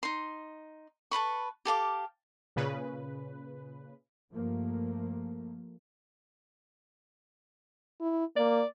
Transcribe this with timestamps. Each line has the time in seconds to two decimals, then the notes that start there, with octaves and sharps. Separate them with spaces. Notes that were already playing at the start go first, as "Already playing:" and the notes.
0.03 D#4 C6
1.11 A4 B4 B5 C#6
1.65 G4 A4 F5 D6
2.56 A#2 C#3 B4
4.32 G2 F3 A3 A#3
8.01 E4
8.36 A#3 D5